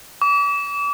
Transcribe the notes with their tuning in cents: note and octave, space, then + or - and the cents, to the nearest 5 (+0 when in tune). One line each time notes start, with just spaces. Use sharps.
D6 -40